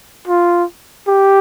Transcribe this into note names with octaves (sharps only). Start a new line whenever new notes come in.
F4
G4